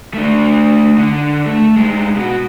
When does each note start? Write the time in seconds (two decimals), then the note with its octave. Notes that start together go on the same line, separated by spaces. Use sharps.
0.14 A3 D4
0.98 D3
1.46 A3
1.77 G2 G#3
2.16 B2 F#4